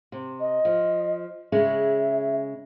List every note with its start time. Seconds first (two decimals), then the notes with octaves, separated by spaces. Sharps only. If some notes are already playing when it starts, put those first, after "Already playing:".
0.12 C3
0.40 D#5
0.65 F3
1.52 C#3 G#3 C#4 E5